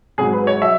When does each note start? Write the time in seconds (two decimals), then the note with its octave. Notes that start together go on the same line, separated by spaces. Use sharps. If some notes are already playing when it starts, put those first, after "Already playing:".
0.18 G#1 G#2 F#3 G#4
0.33 B4
0.47 C#5
0.62 F#3 E5